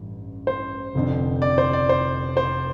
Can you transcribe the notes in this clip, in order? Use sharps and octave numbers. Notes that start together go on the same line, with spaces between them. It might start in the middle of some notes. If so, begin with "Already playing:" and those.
Already playing: A1 G2 E3
C5
F1 F2 D3
D5
C5
D5
C5
C5